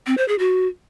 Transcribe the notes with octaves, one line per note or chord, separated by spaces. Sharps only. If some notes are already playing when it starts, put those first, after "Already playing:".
C4
C5
G#4
F#4